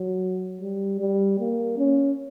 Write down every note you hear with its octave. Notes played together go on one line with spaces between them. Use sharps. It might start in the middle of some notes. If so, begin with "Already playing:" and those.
Already playing: F#3
G3
G3
A#3
C#4